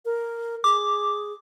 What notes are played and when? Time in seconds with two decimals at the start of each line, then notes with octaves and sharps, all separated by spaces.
0.05 A#4
0.64 G#4 D6